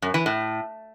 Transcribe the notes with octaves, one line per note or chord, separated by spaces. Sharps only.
F#2
E3
A2